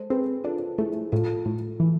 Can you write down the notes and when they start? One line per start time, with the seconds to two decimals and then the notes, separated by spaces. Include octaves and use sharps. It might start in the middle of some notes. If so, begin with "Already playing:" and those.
Already playing: G#3 A4 C5
0.10 C4 G#4 B4
0.44 D4 F4 A4
0.78 A3 E4 G#4
1.12 A2 F4 A4
1.46 A2
1.80 E3